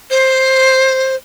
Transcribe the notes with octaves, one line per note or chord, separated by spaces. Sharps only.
C5